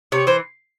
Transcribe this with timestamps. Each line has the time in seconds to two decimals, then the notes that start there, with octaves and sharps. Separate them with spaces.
0.12 C3 C#5
0.27 E3 C5